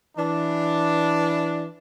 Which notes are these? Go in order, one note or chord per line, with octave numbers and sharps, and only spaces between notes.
E3 D4